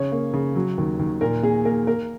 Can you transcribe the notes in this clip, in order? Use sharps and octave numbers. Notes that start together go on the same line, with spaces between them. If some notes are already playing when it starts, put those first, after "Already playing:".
Already playing: C#3 C#5
A#3
C#3
F#3
D#2
D#2
A#2 A#4
A#3 G#4
A#3 A#4
A#3 A#4